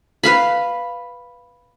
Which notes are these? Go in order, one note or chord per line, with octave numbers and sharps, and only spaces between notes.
B4 F5 B5